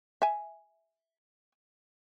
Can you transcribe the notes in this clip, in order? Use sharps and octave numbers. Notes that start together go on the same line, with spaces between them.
E5 G#5